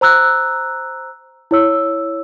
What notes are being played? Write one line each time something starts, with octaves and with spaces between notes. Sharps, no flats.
C5 A#5 E6 F#6
E4 C#5 E6